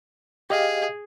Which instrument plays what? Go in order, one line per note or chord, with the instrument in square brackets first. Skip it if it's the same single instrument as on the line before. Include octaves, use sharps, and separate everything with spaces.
[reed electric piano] G4 D#5 F5 [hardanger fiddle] G#4